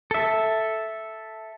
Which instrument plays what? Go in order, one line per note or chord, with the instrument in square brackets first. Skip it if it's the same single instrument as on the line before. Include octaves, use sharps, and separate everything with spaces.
[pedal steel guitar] A4 E5